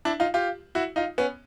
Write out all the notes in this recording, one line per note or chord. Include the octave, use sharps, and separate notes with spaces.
D4 E4
D#4 F4
F4 G4
E4 F#4
D#4 F4
B3 C#4